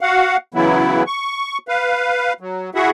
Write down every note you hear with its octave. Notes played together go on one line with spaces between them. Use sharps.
F#4 F5 F#5
C#3 E3 F#3 B3 E4
C#6
B4 F5
F#3
E4 F#4 G#4 E5 F#5